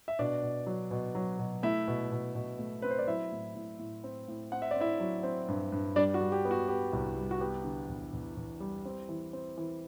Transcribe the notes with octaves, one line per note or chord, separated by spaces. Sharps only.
E5
B2 D4 D5
B2
F#3
B2
F#3
B2
A3 E4 E5
B2
B2
B2
A3
C4 B4
C5
D5
F#3 E4 E5
A2
A2
A2
C4
A2
C4 F#5
E5
C4 D5
E4 E5
F#3
C4
G2
G2
G3 D4 D5
F#4
G3
G4
B3
F#4
B3 G4
C2
G3
F#4
B3 G4
D3
E2
E2
E2
G3
C4
E3
C4
E3